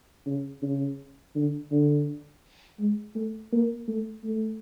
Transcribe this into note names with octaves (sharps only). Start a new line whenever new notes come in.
C#3
C#3
D3
D3
G#3
A3
A#3
A3
A3